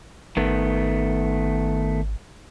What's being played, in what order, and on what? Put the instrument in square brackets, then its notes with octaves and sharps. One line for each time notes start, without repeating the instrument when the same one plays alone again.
[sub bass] G#1 [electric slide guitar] D#3 A3 B3